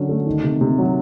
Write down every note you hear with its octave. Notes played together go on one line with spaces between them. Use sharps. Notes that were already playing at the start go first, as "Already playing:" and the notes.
Already playing: D3 F#3 C#4
A3
D#3
C3
C3
F#3